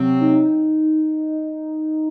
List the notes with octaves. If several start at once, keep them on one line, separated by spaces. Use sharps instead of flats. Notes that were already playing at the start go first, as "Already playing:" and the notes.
Already playing: C3 F#3 C4
D#4